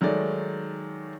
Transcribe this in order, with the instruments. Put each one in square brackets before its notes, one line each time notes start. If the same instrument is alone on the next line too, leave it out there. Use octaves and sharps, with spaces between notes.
[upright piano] D#3 F#3 G#3 A3 D5